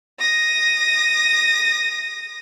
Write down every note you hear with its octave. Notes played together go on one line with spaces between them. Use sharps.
D#6 A#6